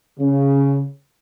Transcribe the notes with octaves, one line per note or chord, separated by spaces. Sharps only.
C#3